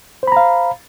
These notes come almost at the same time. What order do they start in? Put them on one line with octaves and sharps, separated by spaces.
C5 B5 A#5 F5